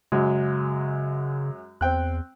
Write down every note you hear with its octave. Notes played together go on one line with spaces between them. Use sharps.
F#2 C#3 F#3 G#3
E2 C4 G5 F#6